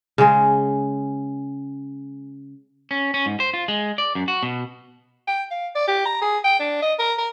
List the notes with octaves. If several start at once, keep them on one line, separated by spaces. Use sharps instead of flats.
C#3 G#3
C#4
C#4
G#2
C5
F4
G#3
D5
F#2
F#4
B2
G5
F5
D5
G4
A#5
G#4
G5
D4
D#5
A#4
A#4